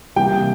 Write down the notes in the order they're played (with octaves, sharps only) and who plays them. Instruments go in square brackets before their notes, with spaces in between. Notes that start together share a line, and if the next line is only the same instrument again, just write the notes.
[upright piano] C3 E3 G3 A#3 [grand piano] G5